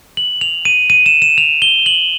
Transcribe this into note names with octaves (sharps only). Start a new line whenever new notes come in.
F#7
F7
D#7
D#7
E7
E7
F7
G7
F#7